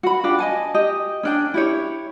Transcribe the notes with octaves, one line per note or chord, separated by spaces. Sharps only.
F#4 B5
D4 F4 G4
D#5 G#5 A5
G4 D#5
C#4 D4 G5
E4 G4 C#5